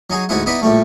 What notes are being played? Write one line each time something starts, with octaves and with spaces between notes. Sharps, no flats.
F#3 D#4 G#4
D2 G#2 G#3 D#4 E4 F#5
B3 D#4 E4 D5 D#5 B5
A#1 A2 G3 A3